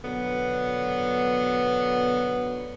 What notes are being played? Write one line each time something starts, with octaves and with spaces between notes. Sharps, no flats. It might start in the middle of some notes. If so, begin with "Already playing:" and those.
B2 D3 F#3 B3